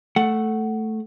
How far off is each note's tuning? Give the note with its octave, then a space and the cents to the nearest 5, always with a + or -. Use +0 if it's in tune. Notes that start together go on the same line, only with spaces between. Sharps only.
A3 +0 F#5 +10